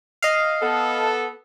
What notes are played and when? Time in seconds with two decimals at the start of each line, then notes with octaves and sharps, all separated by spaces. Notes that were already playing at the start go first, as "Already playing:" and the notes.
0.22 D#5 F5
0.62 B3 A4